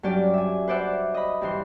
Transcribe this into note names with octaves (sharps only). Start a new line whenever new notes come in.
G2 F#3 C#4 G4 D5 F6
E5 G#5
B4 C5 D5 E5 F#5
D#5 B5
G2 E3 C6